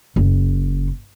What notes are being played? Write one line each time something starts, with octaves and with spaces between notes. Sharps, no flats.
F#1